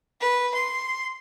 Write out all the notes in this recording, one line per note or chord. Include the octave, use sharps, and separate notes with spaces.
B4
C6